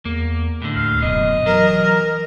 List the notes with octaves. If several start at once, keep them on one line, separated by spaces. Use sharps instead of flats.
E2 A#3
A2 D3
D2 F5
D1 F#2 B2 D#5
E3 F#3 A#4